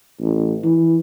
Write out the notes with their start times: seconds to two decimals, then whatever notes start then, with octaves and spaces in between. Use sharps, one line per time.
0.21 A1
0.64 E3